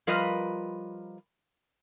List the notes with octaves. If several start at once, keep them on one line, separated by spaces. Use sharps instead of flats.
F3 G3 F4 A#4 B4 D#5